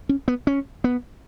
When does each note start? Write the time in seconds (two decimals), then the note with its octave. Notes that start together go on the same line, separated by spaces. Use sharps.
0.09 C#4
0.28 B3
0.47 C#4
0.84 B3